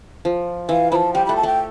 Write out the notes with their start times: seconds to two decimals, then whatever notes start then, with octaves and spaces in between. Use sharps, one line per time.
0.25 F3
0.69 E3 F5
0.91 F3 A5 B5
1.14 G3 G5
1.26 A3 B5
1.36 A5
1.43 A3 G5